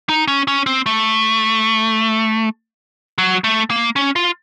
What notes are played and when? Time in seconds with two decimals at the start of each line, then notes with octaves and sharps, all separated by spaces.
0.09 D#4
0.28 C#4
0.48 C#4
0.66 C4
0.86 A3
3.18 F#3
3.44 A3
3.70 A#3
3.96 C#4
4.16 F4